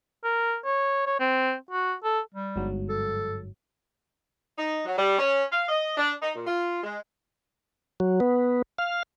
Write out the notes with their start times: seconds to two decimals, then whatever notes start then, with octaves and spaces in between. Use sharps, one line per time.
0.24 A#4
0.65 C#5
1.07 C#5
1.20 C4
1.71 F#4
2.04 A4
2.34 G3
2.56 G1 G#2 F#3
2.89 A4
4.57 D#4
4.84 F#3
4.97 G3
5.18 C#4
5.50 F5
5.68 D#5
5.97 D4
6.21 D#4
6.34 A#2
6.47 F4
6.83 G#3
8.00 F#3
8.20 B3
8.78 F5